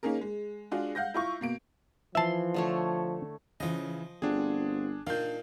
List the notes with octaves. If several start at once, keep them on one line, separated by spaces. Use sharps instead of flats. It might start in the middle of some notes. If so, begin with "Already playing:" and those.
A#3 C#4 D#4 G#4 A#4
G#3
G#3 D4 F4 F#4 G#4
F5 F#5 G6 A#6
E4 F4 C#6
B2 A#3 D7
E3 F3 E5 A5 C6
D3 A3 C#5
C#3 E3 F3 C#4 D#5
G1 C4 D4 F4 F#4 G#4
A#2 D#3 D4 F5 G6